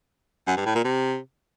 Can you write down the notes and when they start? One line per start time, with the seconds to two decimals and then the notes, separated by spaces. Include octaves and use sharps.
0.47 F#2
0.57 G2
0.66 A2
0.75 A#2
0.84 C3